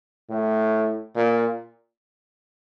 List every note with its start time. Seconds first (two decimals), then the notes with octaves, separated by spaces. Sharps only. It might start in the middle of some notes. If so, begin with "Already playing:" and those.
0.30 A2
1.15 A#2